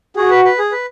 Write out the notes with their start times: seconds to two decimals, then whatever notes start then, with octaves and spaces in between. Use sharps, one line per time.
0.16 F#4 G#4
0.31 B4
0.45 B4
0.59 G#4
0.72 B4